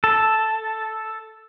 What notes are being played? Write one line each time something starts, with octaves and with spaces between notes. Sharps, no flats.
A4